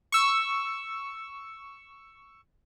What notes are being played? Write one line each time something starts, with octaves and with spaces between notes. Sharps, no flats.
C#6 E6